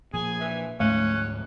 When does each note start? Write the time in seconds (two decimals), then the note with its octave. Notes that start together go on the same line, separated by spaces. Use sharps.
0.14 A#2 F3 G#4 G#5
0.40 E3
0.80 D2 G#2 F3 A3 C#4 F#6